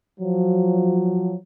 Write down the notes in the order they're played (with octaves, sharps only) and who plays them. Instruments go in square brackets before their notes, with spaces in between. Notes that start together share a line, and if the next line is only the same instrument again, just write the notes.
[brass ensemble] F3 F#3